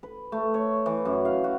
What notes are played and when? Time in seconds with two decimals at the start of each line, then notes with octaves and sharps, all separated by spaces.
0.03 B4
0.32 A3
0.54 C#5
0.86 E3
1.05 F#2
1.25 F5
1.44 F#4